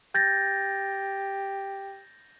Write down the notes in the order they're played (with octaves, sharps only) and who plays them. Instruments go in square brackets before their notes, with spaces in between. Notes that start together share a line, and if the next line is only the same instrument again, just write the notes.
[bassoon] G4 [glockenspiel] G6 A6 A#6